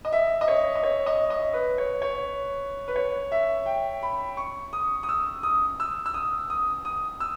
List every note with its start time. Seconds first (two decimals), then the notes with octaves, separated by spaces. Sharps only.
0.05 D#5
0.12 E5
0.41 D#5
0.48 C#5
0.76 D#5
0.83 C#5
1.06 D#5
1.30 D#5
1.54 B4
1.78 C#5
2.02 C#5
2.88 B4
2.96 C#5
3.32 E5
3.66 G5
4.03 B5
4.37 C#6
4.73 D#6
5.03 D#6
5.09 E6
5.43 D#6
5.80 E6
6.06 E6
6.14 D#6
6.50 D#6
6.85 D#6
7.20 E6